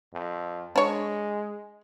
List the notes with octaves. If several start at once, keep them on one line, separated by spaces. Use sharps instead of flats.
F2
G#3 D4 C#5